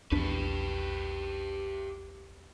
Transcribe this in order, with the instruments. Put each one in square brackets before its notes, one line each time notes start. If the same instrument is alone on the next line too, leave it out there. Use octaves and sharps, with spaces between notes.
[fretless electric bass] A#1 E2 D4 [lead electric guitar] G4 B4